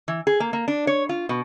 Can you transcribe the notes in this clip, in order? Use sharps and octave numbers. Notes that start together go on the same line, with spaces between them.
E3
G#4
A#3
A#3
D4
C#5
F4
B2